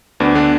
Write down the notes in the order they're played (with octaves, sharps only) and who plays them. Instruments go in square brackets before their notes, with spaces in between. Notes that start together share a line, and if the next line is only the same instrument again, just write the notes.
[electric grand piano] D2 B3 D4
D3 B3 D4